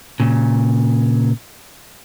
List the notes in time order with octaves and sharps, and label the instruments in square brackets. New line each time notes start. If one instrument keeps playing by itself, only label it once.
[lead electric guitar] A#2 C#3